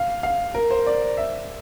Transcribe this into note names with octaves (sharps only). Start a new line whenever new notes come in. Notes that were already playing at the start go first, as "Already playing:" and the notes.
Already playing: F5
F5
A#4
C5
D5
E5